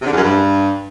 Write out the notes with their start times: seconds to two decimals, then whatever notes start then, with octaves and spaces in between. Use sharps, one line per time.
0.01 C3
0.06 D3
0.12 E2
0.17 F#2
0.22 G2